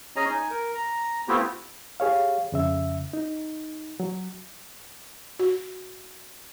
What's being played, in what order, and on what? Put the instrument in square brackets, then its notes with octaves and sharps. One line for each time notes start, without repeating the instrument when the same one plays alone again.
[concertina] C#4 G#4 C#5 D#5 G#5 A#5
D#4 G#5
A#4
A#5
A3 B3 C4 E4 F4 G4
[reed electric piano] G4 G#4 C#5 F5
F2 C#3 E5
D#4
F#3
[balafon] F#4